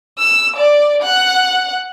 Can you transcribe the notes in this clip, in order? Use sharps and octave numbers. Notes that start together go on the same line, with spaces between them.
E6
D5
F#5